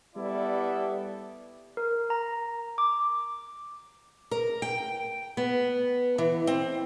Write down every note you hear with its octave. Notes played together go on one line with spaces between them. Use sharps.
G3 B3 E4 A4 D5
A#4
A#5
D6
A#4
G5
B3
E3
C4